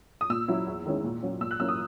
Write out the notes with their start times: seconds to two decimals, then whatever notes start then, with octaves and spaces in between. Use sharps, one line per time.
0.21 D#6
0.30 A#2 E6
0.48 F#3 C#4 E4
0.67 E2
0.86 D#3 G#3 C#4 E4
1.04 A#2
1.23 F#3 C#4
1.41 A#2 E6
1.51 F#6
1.60 F#3 A#3 C#4 E4 E6
1.68 D#6